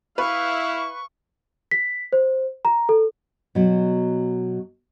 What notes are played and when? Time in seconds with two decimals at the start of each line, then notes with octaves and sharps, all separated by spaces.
0.18 E4 B4 F5 C#6
1.71 B6
2.13 C5
2.65 A#5
2.89 A4
3.55 B2 F#3